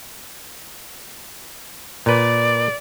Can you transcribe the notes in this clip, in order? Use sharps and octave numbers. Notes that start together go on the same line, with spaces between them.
A#2 B4 D5